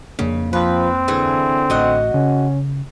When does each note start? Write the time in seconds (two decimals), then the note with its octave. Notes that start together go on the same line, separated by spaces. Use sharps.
0.19 F2 C#3 A#3 D4
0.53 F3 C4 B4
1.08 D3 E3 G#4
1.70 A1 F#4 D#5 F#5
2.14 C#3 C#4